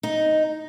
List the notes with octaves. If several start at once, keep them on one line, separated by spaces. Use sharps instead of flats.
D#4